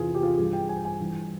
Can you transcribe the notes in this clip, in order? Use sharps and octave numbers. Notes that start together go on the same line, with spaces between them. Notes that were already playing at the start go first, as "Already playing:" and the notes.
Already playing: E2 C3 E3 F4 G#4
G4
F4
G2 E3 G#4
G5
G#5
G#5
G2 E3